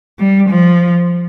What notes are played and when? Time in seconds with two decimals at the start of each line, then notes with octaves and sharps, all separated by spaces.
0.19 G3
0.49 F3